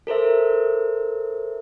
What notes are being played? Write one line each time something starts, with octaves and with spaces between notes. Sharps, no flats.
A4 A#4 C5 E5